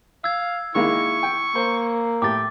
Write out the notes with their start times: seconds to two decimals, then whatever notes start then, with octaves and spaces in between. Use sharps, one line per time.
0.24 F5 E6 G#6
0.75 D#3 G#3 A#3 E4 C#6
1.23 G5
1.55 A#3 C5
2.22 A2 G4 G5 D6 A6